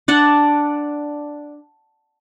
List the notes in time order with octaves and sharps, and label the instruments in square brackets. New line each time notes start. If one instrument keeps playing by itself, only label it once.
[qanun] D4 D5 F#5 A5